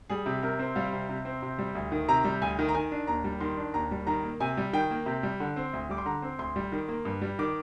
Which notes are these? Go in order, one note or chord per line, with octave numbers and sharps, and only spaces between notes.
G3 G#4
C3
C3 A#4
C4
G3 F5
C3
C3
C4
C3
G3
D2
D#3
C3 A#5
G3
D2 G#5
D#3
A#5
D#3 G#5
D4
D#2 A#5
G3
D#3 C6
D4
D#2 A#5
G3
D#3 A#5
A#3
C3 G#5
G3
D#3 G5
A#3
C3
G3
D3
C4
D2
G3 D6
C6
D3 A#5
C4
D2 C6
G3
D#3
A#3
G2
G3
D#3 D6